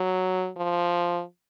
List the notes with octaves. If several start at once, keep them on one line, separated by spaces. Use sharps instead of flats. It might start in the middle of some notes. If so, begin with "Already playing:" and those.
Already playing: F#3
F3